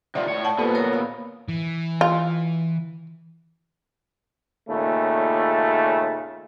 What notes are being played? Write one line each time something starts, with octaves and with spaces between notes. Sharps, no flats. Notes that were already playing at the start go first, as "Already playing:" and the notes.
C3 D#3 F4 D5 E5 F#5
A2 C#5
D5 F#5 A5
A#2 A#3 B3 F4 G4 A4 B4 C5
A#4 C#5 A#5
F5 B5 D#6
E3
F4
D#2 A#2 C#3 A3